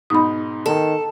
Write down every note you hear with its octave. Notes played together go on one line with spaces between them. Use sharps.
G#2 B2 D#4 B5 D#6
D#3 A4